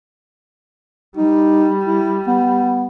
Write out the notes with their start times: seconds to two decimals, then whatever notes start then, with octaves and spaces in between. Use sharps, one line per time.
1.17 G3 D#4
1.85 E4
2.27 B3